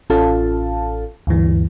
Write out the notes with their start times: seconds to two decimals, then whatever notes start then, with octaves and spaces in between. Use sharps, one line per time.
0.10 A1 C#4 F4 A4 F5 A5
1.27 D2 G2 E3